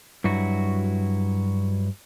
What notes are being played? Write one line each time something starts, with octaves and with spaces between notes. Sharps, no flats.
G2 F#3 E4 F#4